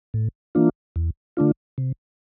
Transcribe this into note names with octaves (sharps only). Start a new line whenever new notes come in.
A2
E3 A#3 D4 F4
E2
D3 A3 D4 F4
C3